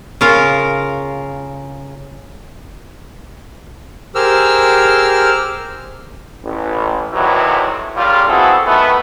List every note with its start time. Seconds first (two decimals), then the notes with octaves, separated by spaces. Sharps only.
0.21 C#3 F4 A#4 F5
4.15 G4 G#4 A#4 C5 E6 F6
6.45 A1
7.13 E2 A2 C3 D#3 E3 F#3
7.96 A#2 C#3 G3 F4
8.29 B3 C4 E4 F#4 G#4 A4
8.67 D#3 A3 B3